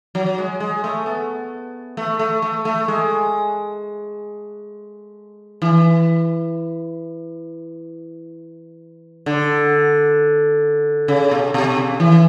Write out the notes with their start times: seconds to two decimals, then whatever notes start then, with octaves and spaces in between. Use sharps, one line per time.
0.15 F#3
0.38 G#3
0.60 G#3
0.84 A3
1.06 B3
1.97 A3
2.19 A3
2.42 A3
2.65 A3
2.88 G#3
5.62 E3
9.26 D3
11.08 C#3
11.31 B2
11.54 B2
11.76 C#3
12.00 E3